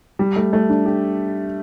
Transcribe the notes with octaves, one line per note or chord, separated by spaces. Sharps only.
G3
A3
A3
D4
G4